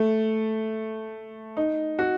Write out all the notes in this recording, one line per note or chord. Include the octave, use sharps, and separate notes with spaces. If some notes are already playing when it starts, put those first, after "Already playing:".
Already playing: A3
D#4
F#4